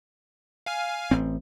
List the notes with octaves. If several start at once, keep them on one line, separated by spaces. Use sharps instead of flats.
F5 G#5 F6
A1 C4